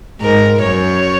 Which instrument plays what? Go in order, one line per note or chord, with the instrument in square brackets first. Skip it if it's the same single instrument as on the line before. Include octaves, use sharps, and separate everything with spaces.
[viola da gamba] G#2 [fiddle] A#4
[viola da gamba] F#2 [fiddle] C#5